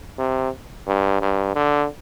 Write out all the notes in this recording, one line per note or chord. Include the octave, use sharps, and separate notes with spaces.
C3
G2
G2
D3